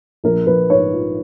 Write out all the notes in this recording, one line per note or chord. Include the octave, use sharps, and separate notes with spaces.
A#1 A#4
A#1 B4
G#2 C#5
F3